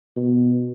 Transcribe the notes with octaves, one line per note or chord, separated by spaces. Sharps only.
B2